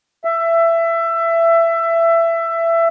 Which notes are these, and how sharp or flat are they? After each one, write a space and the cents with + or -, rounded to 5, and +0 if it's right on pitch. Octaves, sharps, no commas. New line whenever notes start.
E5 +20